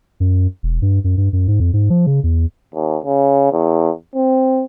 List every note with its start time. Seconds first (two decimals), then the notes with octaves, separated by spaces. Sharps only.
0.20 F#2
0.63 E1
0.82 G2
1.04 F#2
1.17 G2
1.33 F#2
1.48 G#2
1.60 F2
1.73 G#2
1.90 F3
2.07 C#3
2.24 E2
2.74 D#2
3.05 C#3
3.53 E2
4.15 C4